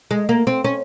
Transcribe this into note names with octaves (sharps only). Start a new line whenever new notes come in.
G#3
A#3
C4
C#4